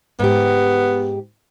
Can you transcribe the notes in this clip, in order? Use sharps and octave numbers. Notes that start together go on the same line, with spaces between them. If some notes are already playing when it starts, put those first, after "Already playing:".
G#2 B3 G4